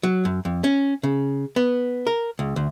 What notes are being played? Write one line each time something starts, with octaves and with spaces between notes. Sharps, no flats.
F#3
F#2
F2
C#4
C#3
B3
A#4
C#2
D2